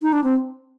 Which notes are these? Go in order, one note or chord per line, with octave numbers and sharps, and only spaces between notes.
D#4
D4
C4